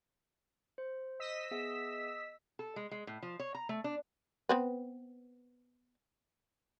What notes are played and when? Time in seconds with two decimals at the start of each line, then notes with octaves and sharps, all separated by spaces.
0.78 C5
1.20 D#5 E6 B6
1.51 B3 G#4 E5
2.59 A4
2.76 G#3
2.91 G#3
3.07 A2
3.23 F3
3.40 C#5
3.55 A#5
3.69 A3
3.84 D4
4.49 B3 C4 B4